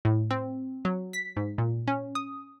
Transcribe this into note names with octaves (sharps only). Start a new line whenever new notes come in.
A2
C4
F#3
B6
G#2
A#2
C#4
D#6